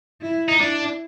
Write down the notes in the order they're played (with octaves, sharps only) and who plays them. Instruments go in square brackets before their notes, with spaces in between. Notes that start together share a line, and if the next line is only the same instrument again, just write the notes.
[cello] E4
[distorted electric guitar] D#4
[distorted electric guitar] D4 [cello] E4